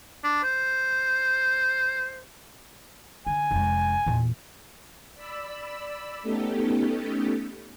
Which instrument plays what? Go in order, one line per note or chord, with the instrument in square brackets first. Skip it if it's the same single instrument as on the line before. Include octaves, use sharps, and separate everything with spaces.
[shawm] D4
C5
[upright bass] D3 [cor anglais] G#5
[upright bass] F1 G#3
E2 A#2
[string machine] D5 B5 E6
A3 B3 C#4 D#4 G4 A4